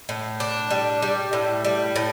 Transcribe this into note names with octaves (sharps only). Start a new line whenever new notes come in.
A2
D4
G3
G3
A2
G3
A2